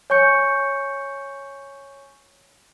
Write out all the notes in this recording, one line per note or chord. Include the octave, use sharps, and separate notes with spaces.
C#5 G#5 C#6 G6 C#7